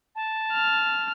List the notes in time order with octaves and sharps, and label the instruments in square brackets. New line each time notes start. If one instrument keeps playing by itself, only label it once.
[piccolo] A5
[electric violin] F6